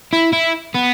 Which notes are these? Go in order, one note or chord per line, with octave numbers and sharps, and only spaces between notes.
E4
E4
B3